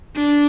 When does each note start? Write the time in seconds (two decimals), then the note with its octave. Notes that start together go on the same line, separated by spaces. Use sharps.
0.16 D4